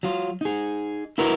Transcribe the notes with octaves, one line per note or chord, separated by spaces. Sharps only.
F#3 F4
D#4 G#4
E4 F#4 A#4 B4